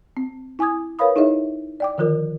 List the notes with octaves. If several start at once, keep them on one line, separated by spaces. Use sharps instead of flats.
C4
E4 G#5 D6 D#6 G#6
A#4 B4 C#5 F5 B5 D#6
D#4 E4 G#4 C#5 D#5 E5
D5 G5 D6
D3 D#3 F3 F4 A#4